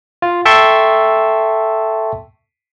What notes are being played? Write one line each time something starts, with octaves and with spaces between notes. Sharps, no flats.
F4
A4 E5 G5 A5 C6 C#6